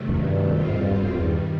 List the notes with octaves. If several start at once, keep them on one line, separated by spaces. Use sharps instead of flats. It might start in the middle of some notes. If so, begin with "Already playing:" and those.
Already playing: E2 C3 D#3 F#3 A3
F#2
G2
F2 B2 G3 C4 F4
G#2
G2
F#2
F2
E2 G2 D#3 G3